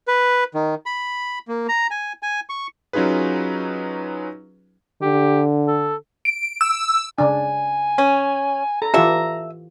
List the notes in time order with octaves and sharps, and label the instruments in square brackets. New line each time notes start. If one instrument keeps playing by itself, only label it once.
[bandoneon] B4
D#3
B5
A#3
A#5
G#5
G#5
C#6
[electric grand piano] F#3 C#4 D#4 F4 G#4 B4
[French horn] D3 [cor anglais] G4
[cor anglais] A4
[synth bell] D7
E6
[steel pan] C#3 D4 [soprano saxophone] G#5
[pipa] C#4
[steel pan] A4 [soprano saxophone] A#5
[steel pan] E3 F4 G4 [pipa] A4 E5